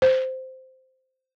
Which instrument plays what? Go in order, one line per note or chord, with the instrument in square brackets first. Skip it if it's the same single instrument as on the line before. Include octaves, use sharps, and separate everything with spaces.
[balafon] C5